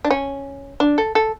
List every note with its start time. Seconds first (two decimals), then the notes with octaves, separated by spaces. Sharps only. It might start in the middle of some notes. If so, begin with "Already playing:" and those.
0.05 D4
0.11 C#4
0.80 D4
0.98 A4
1.15 A4